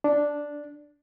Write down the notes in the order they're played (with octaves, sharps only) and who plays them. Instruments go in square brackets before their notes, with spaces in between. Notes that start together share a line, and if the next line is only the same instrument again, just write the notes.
[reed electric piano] D4